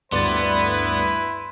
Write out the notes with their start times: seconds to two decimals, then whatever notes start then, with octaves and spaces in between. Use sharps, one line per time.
0.12 D2 G2 B3 E4 B4 D5 C6 A6